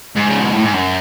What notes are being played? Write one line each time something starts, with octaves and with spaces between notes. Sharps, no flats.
G#2
C#3
B2
A2
G#2
F#2